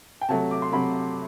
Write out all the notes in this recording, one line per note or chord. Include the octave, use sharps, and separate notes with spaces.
G5
C3 F#3 A3 A5
D6
C6
C3 F#3 A3 B5